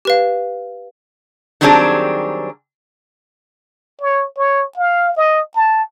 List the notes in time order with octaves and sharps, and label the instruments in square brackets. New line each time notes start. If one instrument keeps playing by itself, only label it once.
[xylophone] G4 B4 F5
[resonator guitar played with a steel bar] D#3 F#3 G3 C4 D4 G#4
[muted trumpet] C#5
C#5
F5
D#5
A5